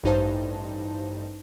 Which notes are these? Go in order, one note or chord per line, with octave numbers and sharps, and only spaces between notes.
A1 G2 D#4 C5 A5